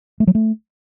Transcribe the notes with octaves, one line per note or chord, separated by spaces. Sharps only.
A3
F#3
A3